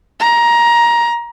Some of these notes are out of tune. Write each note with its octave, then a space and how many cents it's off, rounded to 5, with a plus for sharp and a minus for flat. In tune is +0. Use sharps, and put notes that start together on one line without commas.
A#5 +15